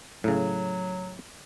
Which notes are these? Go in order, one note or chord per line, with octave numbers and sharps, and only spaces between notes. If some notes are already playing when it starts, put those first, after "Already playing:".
A2 C#3 F#3